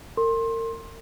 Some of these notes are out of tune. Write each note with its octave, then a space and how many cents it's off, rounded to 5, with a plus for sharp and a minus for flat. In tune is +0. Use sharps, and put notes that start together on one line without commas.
A#4 -40 C6 +25